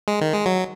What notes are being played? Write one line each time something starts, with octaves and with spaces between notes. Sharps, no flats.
G#3
D#3
G#3
F#3